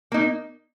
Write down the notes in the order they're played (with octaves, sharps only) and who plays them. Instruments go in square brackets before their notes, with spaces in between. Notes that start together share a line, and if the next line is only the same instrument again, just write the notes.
[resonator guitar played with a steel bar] A#3 D#4